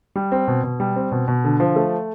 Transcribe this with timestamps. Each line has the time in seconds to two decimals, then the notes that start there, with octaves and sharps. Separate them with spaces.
0.16 G3
0.32 C4
0.48 B2
0.63 B2
0.80 G3
0.96 C4
1.12 B2
1.28 B2
1.44 D3
1.60 F3
1.76 A3